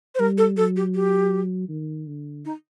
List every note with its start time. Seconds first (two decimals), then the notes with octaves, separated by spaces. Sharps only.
0.15 C5
0.19 G3 A#4
0.38 A4
0.57 F#3 A4
0.76 G4
0.95 G4
1.69 D#3
2.07 D3
2.45 D#4